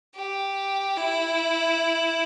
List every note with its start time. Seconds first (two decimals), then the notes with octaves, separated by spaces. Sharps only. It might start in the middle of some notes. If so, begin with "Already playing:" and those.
0.15 G4
0.96 E4